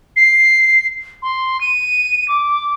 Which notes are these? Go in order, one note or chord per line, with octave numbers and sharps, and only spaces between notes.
C7
C6
D#7
D6